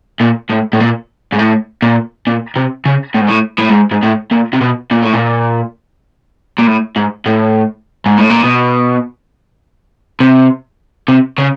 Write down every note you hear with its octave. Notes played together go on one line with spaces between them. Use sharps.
A#2
A2
A2
A#2
G#2
A2
A#2
A#2
C3
C#3
A2
G#2
A2
A2
G#2
G#2
A2
A#2
C3
B2
A#2
A2
A#2
A#2
A2
G#2
A2
G#2
A2
A#2
B2
C3
C3
C#3